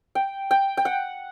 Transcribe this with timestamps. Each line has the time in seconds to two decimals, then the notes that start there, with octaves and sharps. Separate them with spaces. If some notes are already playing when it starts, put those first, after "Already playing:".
0.15 G5
0.51 G5
0.77 G5
0.85 F#5